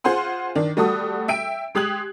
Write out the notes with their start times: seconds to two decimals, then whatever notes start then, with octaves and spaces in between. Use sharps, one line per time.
0.04 F4 G#4 C5 F#5 C6
0.55 D#3 D4
0.77 G3 A3 F#4 A4 D#6
1.28 E5 G5 D7
1.75 G#3 G4 D#6 F#6 G#6 F#7